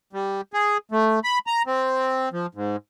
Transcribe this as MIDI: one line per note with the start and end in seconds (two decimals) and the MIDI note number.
0.13 0.41 55
0.53 0.77 68
0.92 1.19 57
1.24 1.39 83
1.47 1.62 82
1.66 2.29 60
2.33 2.46 53
2.55 2.76 44